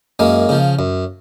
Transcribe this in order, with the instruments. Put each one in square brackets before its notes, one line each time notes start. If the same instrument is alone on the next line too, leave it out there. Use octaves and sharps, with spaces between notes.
[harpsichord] F#2 G#3 A#3
C#3 F3
F#2